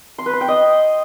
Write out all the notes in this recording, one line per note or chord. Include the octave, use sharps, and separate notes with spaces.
C6
B4
C6
G5
D#5